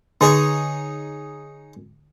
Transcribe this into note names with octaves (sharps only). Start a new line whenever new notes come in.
D3 D#4 G#4 C#5